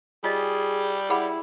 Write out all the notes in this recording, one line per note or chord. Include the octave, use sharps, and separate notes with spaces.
G3 F4 G#4 D#5
E4 G#4 F#5 B5